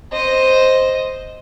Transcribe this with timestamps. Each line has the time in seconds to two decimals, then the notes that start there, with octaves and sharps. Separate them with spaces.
0.12 C5 D#5